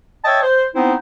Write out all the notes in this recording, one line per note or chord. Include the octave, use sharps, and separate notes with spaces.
C#5 D#5 E5 G5 A5
C5
B3 C4 D#4 E4 C5